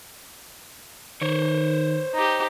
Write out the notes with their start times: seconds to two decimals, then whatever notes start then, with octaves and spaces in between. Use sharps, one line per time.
1.22 D#3 C5 C#5
2.14 D#4 G4